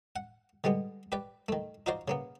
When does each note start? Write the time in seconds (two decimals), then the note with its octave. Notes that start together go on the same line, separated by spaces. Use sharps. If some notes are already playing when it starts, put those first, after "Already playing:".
0.16 F#5
0.64 D3 G3 G#3 B3
1.12 G4 B4 D5
1.49 D#3 A3
1.86 D#4 F4 F#4 C5 D5
2.08 C#3 A#3 B3